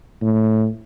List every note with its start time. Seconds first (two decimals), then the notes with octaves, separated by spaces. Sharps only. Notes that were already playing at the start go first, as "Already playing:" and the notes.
0.22 A2